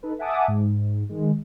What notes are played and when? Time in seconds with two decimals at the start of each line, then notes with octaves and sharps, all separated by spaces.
0.03 D#4 A4 B4
0.19 E5 F#5 G#5 A5 D6 D#6
0.48 G#2
1.09 D#3 G#3